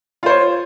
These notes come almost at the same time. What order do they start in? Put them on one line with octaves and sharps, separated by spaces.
F4 C5 C#5